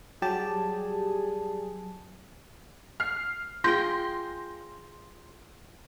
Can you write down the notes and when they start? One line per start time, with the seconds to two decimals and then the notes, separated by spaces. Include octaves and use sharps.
0.22 F#3 G3 G4 G#4 A5
3.00 F6 C7
3.64 F4 G#4 G5 C6 G6 A#6